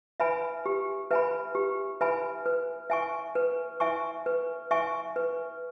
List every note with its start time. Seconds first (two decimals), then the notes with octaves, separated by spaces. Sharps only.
0.20 B4 E5 G#5 B5
0.66 G4
1.11 B4 E5 G#5 B5
1.55 G4
2.01 B4 E5 G#5 B5
2.46 B4
2.90 E5 G#5 C#6
3.35 B4
3.80 E5 G#5 C#6
4.26 B4
4.71 E5 G#5 C#6
5.16 B4